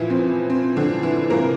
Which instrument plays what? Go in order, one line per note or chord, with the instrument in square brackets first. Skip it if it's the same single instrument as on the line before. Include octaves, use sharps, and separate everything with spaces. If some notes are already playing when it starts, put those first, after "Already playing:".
Already playing: [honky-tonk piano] A#2 E3 F3 E4
C4
C4
D3 D4
E3 E4
C3 E3 A#3 A#4